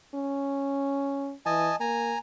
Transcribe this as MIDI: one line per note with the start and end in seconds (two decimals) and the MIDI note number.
0.15 1.33 61
1.46 1.72 52
1.46 1.76 75
1.46 1.76 80
1.46 1.76 81
1.80 2.15 58
1.80 2.18 80
1.80 2.18 82